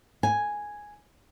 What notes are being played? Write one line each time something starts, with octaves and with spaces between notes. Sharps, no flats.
G#5